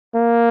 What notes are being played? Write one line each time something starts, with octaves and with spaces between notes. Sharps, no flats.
A#3